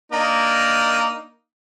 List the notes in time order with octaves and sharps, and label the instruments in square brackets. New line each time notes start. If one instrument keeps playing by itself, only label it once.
[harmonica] A#3 D4 D#4